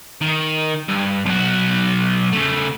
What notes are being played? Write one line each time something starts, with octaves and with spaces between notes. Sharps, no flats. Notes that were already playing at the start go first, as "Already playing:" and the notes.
D#3
G2
B1 F#4
C#3 A3